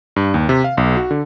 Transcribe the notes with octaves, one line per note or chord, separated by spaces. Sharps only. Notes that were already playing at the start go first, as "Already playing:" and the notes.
G2
D#2
C3
F5
B1
F#4
D3